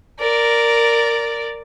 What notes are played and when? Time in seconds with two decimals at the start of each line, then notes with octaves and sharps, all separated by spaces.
0.19 A#4 D5